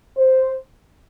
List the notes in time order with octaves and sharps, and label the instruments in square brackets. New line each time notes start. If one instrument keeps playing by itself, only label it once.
[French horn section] C5